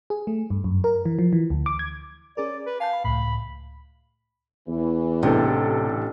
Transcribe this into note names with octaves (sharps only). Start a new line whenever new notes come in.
G#4
A3
G2
F#2
A#4
E3
F3
E3
D2
D6
G#6
C#4 G#4 A#4 D5
B4
F5 G#5 A5 G6
B5
C#2 A2 B5
E2 E3
A1 C3 D4 A4